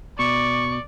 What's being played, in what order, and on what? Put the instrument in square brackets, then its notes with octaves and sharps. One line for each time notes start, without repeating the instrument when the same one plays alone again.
[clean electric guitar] B2 [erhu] D5 [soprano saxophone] C#6